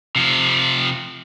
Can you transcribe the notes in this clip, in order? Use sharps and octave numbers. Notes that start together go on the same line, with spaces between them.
C3 F3